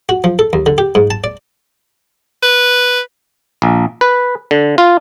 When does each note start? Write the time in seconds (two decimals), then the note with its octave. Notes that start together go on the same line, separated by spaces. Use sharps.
0.09 F#4
0.24 F3
0.39 A4
0.53 D#2
0.66 D3
0.78 G4
0.95 G#2
1.10 A5
1.24 D5
2.43 B4
3.62 A#1
4.01 B4
4.51 D3
4.78 F4